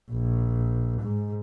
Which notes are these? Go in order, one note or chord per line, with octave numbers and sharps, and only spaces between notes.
A#1
G#2